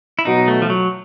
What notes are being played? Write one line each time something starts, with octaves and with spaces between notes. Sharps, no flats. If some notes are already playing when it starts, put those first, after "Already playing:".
E4
B2 F#3 B3 D#4
A3
F3
F#3